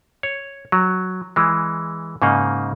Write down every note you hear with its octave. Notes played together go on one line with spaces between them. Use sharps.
C#5
F#3
E3 G#3
G#2 C#3 A#3 D#4